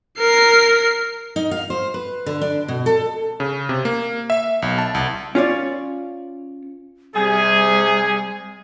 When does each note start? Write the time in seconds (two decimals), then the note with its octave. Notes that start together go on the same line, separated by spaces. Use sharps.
0.19 A#4 C7
1.36 D#4
1.51 F5
1.70 C5
1.94 B4
2.26 D3
2.42 D4
2.68 B2
2.86 A4
3.40 C#3
3.69 C3
3.85 A#3
4.30 E5
4.62 B1
4.78 A5
4.95 C2
5.35 C#4 F4 C#5 D5
7.15 C3 G3 G#4